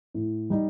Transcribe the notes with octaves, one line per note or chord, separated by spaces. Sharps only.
A2
G3 D#4